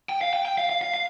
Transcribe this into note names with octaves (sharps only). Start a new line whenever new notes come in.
G5
F5
G5
G5
F5
F5
F5
F5